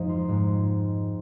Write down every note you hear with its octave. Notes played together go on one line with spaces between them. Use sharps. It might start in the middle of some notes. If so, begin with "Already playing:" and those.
Already playing: F2 G#2 F3 G#3 D#4
F4
G#2 G#3